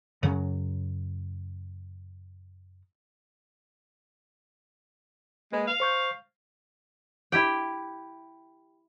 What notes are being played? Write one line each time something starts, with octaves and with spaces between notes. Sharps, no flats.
F#2 C#3 F#3
G#3 A#3 B4
F5
C5 C#6 G6
E4 G4 G5